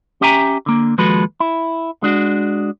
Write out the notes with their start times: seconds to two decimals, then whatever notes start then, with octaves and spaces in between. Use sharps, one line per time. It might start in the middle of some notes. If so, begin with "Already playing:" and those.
0.21 C#4 G4 E5 G5 G#5 A#5
0.66 D3 A#3
0.98 D#2 F3 G#3 F#4 A4 B4
1.40 E4
2.03 G#3 D4 F#4